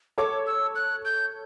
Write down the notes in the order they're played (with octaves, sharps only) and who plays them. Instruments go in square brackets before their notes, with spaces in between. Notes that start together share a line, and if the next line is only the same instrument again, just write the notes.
[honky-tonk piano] A4 C#5 [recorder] D6
[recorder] E6
F#6
G6